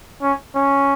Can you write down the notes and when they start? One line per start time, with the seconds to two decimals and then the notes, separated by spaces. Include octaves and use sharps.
0.22 C#4
0.56 C#4